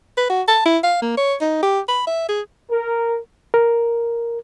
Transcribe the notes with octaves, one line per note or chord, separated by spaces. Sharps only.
B4
F#4
A5
E4
F5
A#3
C#5
D#4
G4
B5
E5
G#4
A#4
A#4